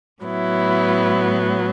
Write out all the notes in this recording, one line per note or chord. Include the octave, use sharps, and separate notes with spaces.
A2 F#3 B3 E4